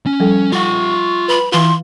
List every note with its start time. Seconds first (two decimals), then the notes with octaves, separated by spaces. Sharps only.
0.06 C#4
0.20 F3 G3 A4
0.52 F4 F#5 C#6
1.28 B4 B5
1.52 E3 F4 C6